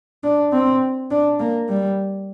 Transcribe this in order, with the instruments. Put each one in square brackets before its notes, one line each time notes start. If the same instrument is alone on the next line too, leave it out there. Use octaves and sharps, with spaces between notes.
[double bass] D4
C4
D4
A#3
G3